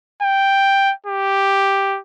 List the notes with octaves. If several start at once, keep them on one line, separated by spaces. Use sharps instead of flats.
G5
G4